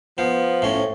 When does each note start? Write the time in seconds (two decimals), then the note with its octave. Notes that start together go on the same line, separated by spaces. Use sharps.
0.18 F3 B3
0.62 A2 C#4